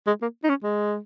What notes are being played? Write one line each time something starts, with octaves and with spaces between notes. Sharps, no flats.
G#3
A#3
D#4
C#4
G#3